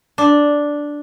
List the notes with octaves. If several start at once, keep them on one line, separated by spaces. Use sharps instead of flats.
D4